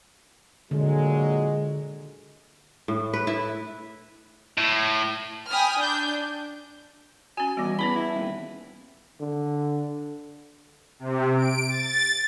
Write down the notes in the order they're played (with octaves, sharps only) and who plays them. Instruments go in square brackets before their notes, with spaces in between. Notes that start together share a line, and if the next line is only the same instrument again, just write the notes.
[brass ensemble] A#2 F#3 G#3 [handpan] D3
[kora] A2
B4
E4
[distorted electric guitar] A2
[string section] G5 G#5 B5 D#6 F6
D4 G6
[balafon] C#4 F#4 [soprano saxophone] G#5
[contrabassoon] B2 [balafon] E3 G3
[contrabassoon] E2 [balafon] B3 B4 A5 [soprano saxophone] B5
[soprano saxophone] E4
[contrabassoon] D#1
[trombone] D3
[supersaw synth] C3
D7
A6